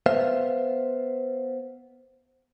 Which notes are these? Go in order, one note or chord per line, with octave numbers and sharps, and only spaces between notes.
B3 C5 E5 F5